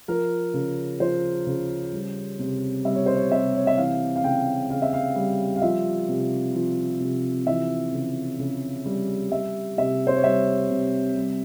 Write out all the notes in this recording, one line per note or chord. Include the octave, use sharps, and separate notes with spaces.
F3 A#4
C#3
F3 C5
C#3
G3
C3
G3 E5
C#5
C5
C#5
C3 E5
C#5
E5
E3 F5
F5
C#3 G5
C#3 F5
E5
F5
G3
F5
F3 E5
C3
F3
C3
E3 E5
C#3
C#3
G3
G3 E5
C3 E5
C5
C#5
G3 E5
C3
G3